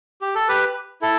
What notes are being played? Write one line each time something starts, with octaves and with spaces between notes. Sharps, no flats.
G4
A4
G4 B4
E4 A4